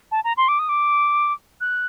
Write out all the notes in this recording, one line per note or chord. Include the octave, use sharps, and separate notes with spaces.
A5
A#5
C6
D6
D#6
D6
F#6